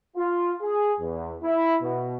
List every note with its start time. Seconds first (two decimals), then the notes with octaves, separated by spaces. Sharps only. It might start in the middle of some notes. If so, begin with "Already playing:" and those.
0.16 F4
0.62 G#4
1.00 E2
1.42 E4
1.82 B2